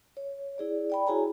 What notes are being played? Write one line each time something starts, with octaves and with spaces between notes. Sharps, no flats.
C#5
E4 G#4 D5
D5 G5 B5
E4 F#4 G#4 C#5 G#5 A#5